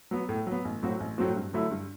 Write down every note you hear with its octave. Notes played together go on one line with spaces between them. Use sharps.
F#3 B3
A2
F#3 B3
A1
A2 F#3 C4 F#4
A1
A2 F#3 C4 F#4
G2
D3 F#3 A3 E4
G2